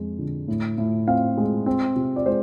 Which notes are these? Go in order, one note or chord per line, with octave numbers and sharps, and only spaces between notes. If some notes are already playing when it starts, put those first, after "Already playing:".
Already playing: F2 G#3
D3
A2
A2
C4 F5
G#3
C4
C3
D5
G#3 C5